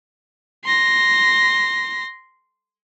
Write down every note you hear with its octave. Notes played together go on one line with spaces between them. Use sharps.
C6 A#6